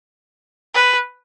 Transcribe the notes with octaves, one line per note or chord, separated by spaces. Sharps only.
B4